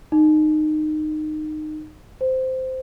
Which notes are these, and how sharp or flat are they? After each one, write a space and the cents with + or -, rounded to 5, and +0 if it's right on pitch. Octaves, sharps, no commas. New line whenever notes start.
D#4 -20
C5 -10